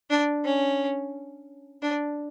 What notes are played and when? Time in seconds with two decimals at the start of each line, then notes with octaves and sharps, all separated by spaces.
0.10 D4
0.45 C#4
1.82 D4